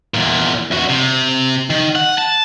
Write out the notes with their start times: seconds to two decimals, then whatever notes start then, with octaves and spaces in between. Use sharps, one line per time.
0.14 E2 A#2
0.71 E2 F#4
0.89 C3
1.70 D#3
1.95 F#5
2.18 A5